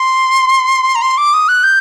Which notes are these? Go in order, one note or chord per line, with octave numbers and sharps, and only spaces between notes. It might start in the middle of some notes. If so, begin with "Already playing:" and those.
Already playing: C6
A#5
C6
D6
D#6
F#6
G6